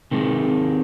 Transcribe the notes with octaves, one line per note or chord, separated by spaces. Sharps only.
C3 D#3 G#3